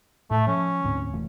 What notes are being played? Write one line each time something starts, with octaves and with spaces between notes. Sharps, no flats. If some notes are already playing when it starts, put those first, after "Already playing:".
A2 A3
F3 C#4
D2 G#2 C4
F1 E3 A3